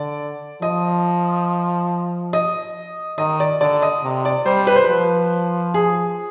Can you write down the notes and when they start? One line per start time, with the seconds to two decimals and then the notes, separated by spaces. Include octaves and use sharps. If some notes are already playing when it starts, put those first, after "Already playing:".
Already playing: D3 D5
0.62 F3 D#5
2.33 D#5
3.18 D#3 D#5
3.40 D5
3.61 D3 D5
3.82 D#5
4.04 C3
4.25 D5
4.46 G3 C5
4.67 B4
4.76 C5
4.84 F3 B4
5.74 G#4